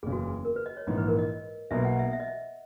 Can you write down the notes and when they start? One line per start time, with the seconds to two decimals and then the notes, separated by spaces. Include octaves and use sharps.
0.03 F#1 E2 C#3 G#4
0.12 F#4
0.20 G#4
0.45 A#4
0.56 B4
0.66 D#5
0.77 C#5
0.87 A#1 G#2 E3 D#5
0.98 B4
1.08 A#4
1.19 D#5
1.29 D#5
1.71 B1 B2 A#3 E5
1.85 F#5
1.99 E5
2.13 E5
2.20 D#5
2.28 E5